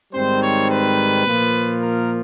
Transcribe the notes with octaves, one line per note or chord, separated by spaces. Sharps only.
G#2 D#3 G3 C4 C5
C#5
B4
A#2 F3 A#3
A#4